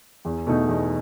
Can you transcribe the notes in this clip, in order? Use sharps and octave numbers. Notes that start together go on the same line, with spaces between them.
E2
B2 A3 D#4
E2